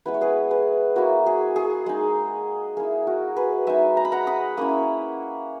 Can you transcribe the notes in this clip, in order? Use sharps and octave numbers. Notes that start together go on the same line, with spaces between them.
G#3 B3 E4 B4
C#5
G#4 B4
G#4 B4
A#3 E4 F#4
G#4
G#4
G#3 D#4
A#3 E4 G#4
F#4 A#4
G#4 B4
G#3 D#4 E5 G#5
A#5
B5
F#5 A#5
B5 D#6
A#3 C#4 E4 B5 D#6